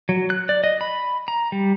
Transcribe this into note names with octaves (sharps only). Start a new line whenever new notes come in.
F#3
F#6
D5
D#5
B5
A#5
G3